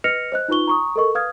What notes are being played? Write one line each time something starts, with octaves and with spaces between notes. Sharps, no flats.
B4 D#5 F6 A#6 C#7 F7
C5 D#5 F#6
D#4 F4 B4 C#6 G7
A#5 C#6 D#6
A4 A#4 D#5 C#6
B4 F5 D#6 F6 G#6